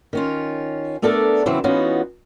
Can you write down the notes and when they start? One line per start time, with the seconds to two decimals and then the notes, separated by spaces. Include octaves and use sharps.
0.13 D#3 C#4 F4
1.02 A3 B3 D4 A4 A#4 D5
1.46 C#3 E3 F#3 C4 E4
1.64 E3 B3 C#4 D#4 F4 F#4